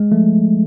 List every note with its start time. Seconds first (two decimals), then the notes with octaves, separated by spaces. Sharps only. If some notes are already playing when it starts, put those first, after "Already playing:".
Already playing: G#3
0.12 F3 A3